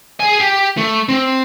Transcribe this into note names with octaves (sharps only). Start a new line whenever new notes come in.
G#4 G#5
G4
A3
C4